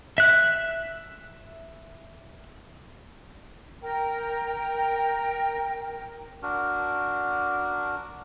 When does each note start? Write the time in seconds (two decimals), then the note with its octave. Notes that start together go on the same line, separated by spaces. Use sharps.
0.18 E5 F#6
3.82 A#4 G5
6.43 D4 F#4 A#4